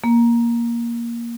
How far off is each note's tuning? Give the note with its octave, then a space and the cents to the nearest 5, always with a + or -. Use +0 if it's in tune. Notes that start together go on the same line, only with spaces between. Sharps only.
A#3 +10